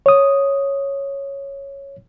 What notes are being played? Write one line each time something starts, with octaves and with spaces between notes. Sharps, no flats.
C#5 D#6